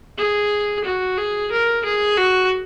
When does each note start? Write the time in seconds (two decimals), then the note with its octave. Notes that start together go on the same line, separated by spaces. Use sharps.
0.18 G#4
0.84 F#4
1.17 G#4
1.51 A#4
1.85 G#4
2.17 F#4